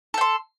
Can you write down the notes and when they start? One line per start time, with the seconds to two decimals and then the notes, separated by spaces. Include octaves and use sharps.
0.14 A4
0.18 G5
0.21 C6